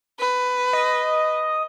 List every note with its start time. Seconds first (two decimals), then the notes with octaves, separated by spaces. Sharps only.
0.19 B4
0.73 D#5